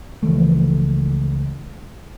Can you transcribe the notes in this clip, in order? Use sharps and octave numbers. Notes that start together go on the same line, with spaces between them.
C#2 E3 F3 A3